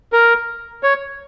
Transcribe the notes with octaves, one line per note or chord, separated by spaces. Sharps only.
A#4
C#5